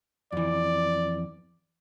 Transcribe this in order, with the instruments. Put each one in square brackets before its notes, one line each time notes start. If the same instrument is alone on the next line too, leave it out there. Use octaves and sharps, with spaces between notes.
[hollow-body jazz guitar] F2 E3 [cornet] D5